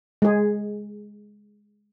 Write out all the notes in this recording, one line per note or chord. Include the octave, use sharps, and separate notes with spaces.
G#3 G#4